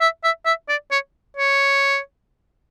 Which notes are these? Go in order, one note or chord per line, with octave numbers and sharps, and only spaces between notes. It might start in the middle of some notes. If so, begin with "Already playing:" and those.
E5
E5
E5
D5
C#5
C#5